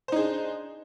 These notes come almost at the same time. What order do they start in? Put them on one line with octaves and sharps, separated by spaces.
C5 D#4 G#4 D4